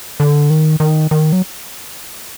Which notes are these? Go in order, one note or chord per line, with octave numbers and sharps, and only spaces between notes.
D3
D#3
D#3
D#3
F#3